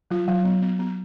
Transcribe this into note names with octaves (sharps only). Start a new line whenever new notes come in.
F#3 F4
F#3
B3
B3
B3